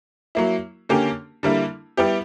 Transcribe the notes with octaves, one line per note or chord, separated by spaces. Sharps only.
F#3 A#3 E4
D3 A#3 C#4 G4
D3 G3 A#3 E4
G3 B3 E4 G4